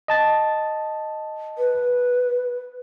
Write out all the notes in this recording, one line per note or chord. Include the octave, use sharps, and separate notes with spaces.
D#5 A5 A6
B4